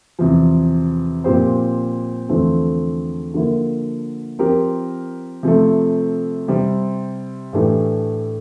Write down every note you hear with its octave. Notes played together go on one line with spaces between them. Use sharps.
E2 C3 F3
A#2 F3 C4 G4 C5
E2 D3 F3 A3 C4
D3 F3 A#3 E4
F3 C4 G4 A#4
C3 F3 A3
C3 G3 C4
A2 E3 A3 D4 G4